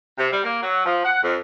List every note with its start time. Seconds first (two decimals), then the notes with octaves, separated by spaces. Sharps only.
0.18 C3
0.32 G3
0.44 A#3
0.63 F#3
0.85 F3
1.05 F#5
1.23 F2